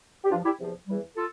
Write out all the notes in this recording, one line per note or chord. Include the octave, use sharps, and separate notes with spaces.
G4
G2 F3 D4 F4
E4 G4
E2 C3 F3
E2 E3 G3
F4 A4